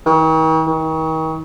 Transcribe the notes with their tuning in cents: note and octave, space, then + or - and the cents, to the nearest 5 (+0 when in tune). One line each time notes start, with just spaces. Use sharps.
D#3 +45
D#3 +40